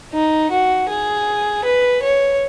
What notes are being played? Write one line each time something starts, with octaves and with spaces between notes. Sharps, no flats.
D#4
F#4
G#4
B4
C#5